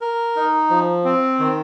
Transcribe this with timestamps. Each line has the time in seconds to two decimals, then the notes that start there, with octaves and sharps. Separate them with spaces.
0.01 A#4
0.36 D#4
0.70 F3
1.05 C4
1.40 D#3